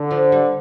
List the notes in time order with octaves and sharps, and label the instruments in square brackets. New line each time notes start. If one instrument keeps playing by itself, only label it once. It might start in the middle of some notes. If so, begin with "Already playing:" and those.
Already playing: [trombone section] D3
[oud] F3
G3